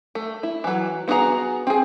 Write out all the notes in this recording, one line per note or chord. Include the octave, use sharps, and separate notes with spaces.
A3
E4
E3 F#3
B3 E4 F#4 G#4 A#5
C4 G#4